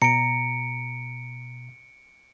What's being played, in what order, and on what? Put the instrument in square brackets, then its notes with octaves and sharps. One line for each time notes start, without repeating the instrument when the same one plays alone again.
[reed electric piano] B2 A#5 [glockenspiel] C#7 D7